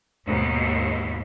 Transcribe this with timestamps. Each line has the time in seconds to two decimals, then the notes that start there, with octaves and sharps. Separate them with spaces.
0.25 D#2 G#2 B2